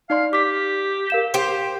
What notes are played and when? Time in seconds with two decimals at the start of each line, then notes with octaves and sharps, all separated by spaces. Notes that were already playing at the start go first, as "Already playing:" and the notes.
0.10 D#4 D5 F5 C6
0.33 G4 D6 B6
1.10 A#4 F5 E7
1.34 G4 C5